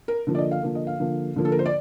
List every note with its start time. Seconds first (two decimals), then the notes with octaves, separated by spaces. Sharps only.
0.08 A#4
0.27 D3 F3 A#3
0.35 D5
0.38 D#5
0.51 F5
0.63 D3 F3 A#3
0.75 D#5
0.87 F5
1.00 D3 F3 A#3
1.36 D3 F3 A#3
1.45 A4
1.52 A#4
1.59 C5
1.66 D5